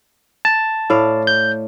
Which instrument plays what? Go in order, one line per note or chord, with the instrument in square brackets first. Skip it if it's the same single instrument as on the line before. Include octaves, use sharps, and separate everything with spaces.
[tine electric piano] A5
[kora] A2 D5 F5
[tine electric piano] G6